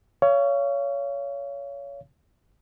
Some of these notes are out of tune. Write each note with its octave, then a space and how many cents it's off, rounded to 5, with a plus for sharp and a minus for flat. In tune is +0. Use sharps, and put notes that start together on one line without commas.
C#5 +25 F5 -30